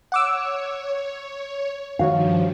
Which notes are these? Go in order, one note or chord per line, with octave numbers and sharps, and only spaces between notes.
C#5 F#5 D6 E6
G2 D#3 F3 F#4 C#5 F5